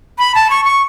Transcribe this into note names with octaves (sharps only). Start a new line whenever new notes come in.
B5
A5
C#6
C#6